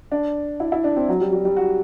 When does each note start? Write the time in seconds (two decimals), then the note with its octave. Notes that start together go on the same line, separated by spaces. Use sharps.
0.12 D4
0.60 E4
0.72 E4
0.84 D4
0.96 C4
1.08 F#3
1.21 G3
1.32 G3
1.45 G3
1.57 F#4